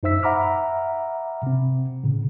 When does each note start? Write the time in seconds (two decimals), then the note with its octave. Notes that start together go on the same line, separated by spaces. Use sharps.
0.03 F#2 D#4 C5 E5 E6 B6
0.23 E5 F#5 A#5 B5 D6 F6
1.43 C3 C4
2.03 A2 C#3